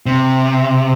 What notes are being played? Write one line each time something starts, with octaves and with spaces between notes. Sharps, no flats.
C3